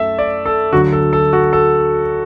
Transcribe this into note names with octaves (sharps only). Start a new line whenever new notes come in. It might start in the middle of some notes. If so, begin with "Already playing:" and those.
Already playing: F#2 A3 A4 E5
D5
A4
D2 D3 F#3 F#4
A4
A4
F#4
A4